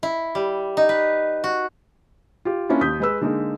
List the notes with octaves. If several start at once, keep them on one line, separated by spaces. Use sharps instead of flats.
E4
G3
D#4
B4
F#4
F4 G4
A#3 C#4 D4 E4 F4
D#2 D#6 G6 B6
G#3 B4 E6
D3 G#3 A#3 D#4